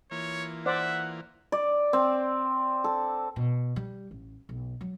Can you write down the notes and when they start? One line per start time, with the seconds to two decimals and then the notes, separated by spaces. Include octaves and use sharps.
0.11 E3 A#3 F4 C#5
0.66 C5 D5 E5 F#5
1.52 D5
1.93 C4
2.84 A4
3.36 B2
3.76 G3
4.11 A1
4.49 B1
4.81 F#3